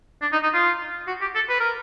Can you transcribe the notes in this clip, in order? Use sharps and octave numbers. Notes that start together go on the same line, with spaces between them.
D4
D#4
D#4
F4
F#4
G4
A4
B4
A#4